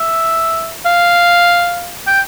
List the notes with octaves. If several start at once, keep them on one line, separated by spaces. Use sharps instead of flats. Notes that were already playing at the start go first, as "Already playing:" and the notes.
Already playing: E5
F5
G5